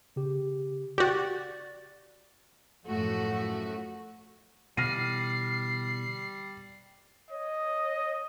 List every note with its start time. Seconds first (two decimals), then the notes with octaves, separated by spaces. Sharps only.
0.16 C#3 G4
0.98 F#4 G4 D5 A6
2.87 F#2 A2 F3 A3 F#4
4.77 B2 D3 E3 G3 F6 A#6 C7 D#7
7.31 C#5 D#5